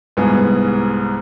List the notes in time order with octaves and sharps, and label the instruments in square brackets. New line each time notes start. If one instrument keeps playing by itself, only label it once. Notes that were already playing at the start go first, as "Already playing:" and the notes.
[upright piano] C2 G#2 B3 G#4